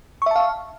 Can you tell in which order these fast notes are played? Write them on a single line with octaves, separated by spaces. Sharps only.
C#6 E5 A5 F5